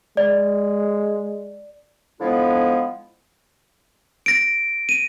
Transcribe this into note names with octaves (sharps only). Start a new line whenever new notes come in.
G#3 D5
D3 F3 G#3 B3 E4
A#6 D7
D#7